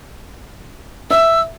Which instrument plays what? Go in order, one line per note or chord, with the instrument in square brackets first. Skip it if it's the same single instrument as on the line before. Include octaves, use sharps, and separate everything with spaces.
[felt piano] E5 [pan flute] E6